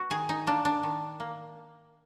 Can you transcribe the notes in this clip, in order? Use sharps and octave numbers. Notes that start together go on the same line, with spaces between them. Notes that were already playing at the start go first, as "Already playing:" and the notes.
Already playing: B3 F#4
D#3 G#4
D#4
A#3 D4
D4
D#3
A#3